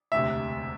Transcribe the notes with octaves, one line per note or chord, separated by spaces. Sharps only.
E1 D2 C3 E5